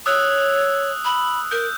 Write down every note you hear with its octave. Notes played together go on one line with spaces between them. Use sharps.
C#5 D#6 E6 F#6
B5
A#4 G6